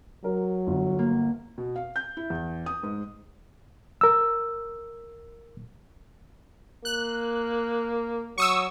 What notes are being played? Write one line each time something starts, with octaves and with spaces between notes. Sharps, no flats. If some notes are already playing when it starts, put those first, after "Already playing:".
F#3 A#4
G1
A#3
B2
F5
G6
E4
E2
D#6
G#2
A#4 E6
A#3 F#6
F#3 C#6 D#6 E6